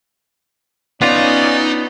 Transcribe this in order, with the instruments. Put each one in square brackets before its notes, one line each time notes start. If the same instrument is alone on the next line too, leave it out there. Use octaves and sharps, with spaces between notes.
[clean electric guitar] B3 F4 [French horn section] C#4 [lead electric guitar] D#4 [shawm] D5